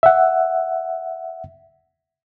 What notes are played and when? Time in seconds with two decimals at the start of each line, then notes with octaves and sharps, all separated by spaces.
0.03 E5 F#5